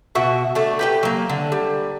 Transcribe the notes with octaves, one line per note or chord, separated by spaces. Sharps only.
B2 F#4 E5
A3 D4
G4 B4 G5
F#3 A#3
D3
G3